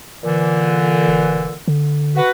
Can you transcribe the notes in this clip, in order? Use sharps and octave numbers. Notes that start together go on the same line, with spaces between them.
A#2 D3 E3
E1
D3
F#4 B4